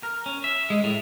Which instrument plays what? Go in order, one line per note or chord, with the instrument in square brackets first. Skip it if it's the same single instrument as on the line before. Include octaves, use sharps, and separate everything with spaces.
[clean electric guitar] A#4
C#4
E5
G#3
A2